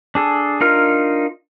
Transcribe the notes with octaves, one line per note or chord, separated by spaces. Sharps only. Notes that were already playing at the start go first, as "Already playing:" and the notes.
D4 G#4 A4
D4 D#4 F4 A#4 F6